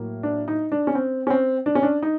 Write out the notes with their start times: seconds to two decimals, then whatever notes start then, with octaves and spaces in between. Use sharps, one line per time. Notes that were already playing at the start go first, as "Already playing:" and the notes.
Already playing: A2 F#3 A#3
0.23 D4
0.48 D#4
0.72 D4
0.87 C#4
0.95 C4
1.27 C#4
1.30 C4
1.66 D4
1.75 C#4
1.83 D4
2.03 D#4